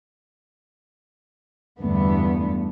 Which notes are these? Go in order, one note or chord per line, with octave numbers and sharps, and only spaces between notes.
E2 G2 D3 A3 B3